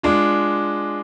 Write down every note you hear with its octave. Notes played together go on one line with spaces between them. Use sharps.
G#3 D4 F4